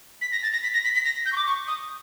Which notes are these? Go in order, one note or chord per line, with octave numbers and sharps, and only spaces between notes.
B6
A#6
A6
A#6
B6
A#6
B6
B6
A#6
G6
C#6
D6
C#6
D#6